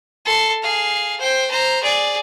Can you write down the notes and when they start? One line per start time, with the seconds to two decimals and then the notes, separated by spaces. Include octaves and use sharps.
0.25 A4 C6
0.63 G#4 F5
1.20 C5 G5
1.50 C5 A#5
1.83 G#4 D5